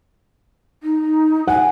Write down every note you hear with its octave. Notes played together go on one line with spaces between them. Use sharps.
D#4
F#5 G#5